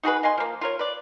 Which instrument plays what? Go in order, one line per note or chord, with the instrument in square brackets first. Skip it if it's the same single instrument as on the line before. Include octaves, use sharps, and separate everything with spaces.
[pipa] D#4 F#4 G#4 B4
D#5 F5 G#5 C6
F3 A#3
F4 A#4 C#5
B4 D5